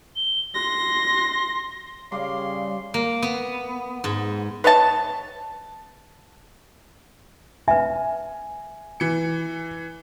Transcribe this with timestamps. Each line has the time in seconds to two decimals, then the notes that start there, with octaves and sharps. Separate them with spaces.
0.16 G7
0.55 C6 A#6
2.12 C#3 G3 D5 F5 C6 D6
2.94 A#3
3.22 B3
4.04 G#2
4.64 B4 C#5 D#5 A5
7.68 B4 E5 G#5
9.00 E3 C#7